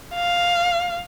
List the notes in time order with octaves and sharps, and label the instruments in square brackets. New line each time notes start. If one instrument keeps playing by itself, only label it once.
[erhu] F5